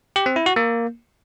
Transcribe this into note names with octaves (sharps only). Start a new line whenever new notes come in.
G4
C4
E4
F#4
A#3